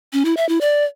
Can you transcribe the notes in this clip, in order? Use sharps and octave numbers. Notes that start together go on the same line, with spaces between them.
C#4
E4
E5
E4
D5